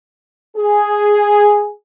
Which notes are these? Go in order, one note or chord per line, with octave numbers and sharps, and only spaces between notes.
G#4